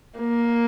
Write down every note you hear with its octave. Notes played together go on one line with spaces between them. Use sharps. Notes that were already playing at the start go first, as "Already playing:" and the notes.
A#3